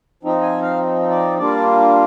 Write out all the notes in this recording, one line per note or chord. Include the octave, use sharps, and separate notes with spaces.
F3 C4 D#4
G#5
F5
D5
G3 A#3 D4 F4 D5